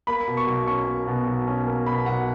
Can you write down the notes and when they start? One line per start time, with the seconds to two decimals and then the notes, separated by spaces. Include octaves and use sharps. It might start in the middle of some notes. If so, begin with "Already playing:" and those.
0.07 A#3 B5
0.28 B2
0.37 C#6
0.47 B1
0.67 C#4 C#6
0.87 A#3
1.07 B2
1.27 B1
1.47 C#4
1.67 A#3
1.86 B2 B5
2.06 B1 F#5